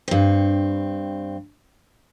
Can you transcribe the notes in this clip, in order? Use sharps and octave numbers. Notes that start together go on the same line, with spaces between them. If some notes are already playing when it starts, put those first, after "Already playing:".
G2 C4